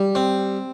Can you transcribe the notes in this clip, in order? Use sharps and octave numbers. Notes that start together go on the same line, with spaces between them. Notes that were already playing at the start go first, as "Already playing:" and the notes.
Already playing: G3
C4